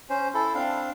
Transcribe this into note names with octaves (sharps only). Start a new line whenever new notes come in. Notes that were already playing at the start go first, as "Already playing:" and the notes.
C#4 C5
E4 A4
C4 D4 F5